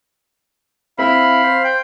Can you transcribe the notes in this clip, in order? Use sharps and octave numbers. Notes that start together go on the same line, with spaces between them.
C4 E4 F5 B5
C5
G5